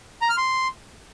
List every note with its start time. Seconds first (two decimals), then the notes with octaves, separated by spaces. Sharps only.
0.22 A#5
0.30 F6
0.37 C6